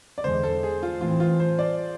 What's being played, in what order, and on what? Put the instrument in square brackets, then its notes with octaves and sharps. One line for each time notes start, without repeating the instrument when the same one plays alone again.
[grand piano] D5
[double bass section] E2 D3 G#3 [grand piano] C5
[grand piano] A4
G#4
F4
[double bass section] A2 E3 A3 C4 [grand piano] F4
[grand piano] F4
C5
D5